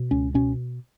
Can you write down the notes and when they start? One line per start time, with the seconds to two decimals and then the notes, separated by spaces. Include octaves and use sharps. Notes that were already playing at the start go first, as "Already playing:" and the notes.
Already playing: B2
0.11 C#2 C#4
0.34 B2 C#4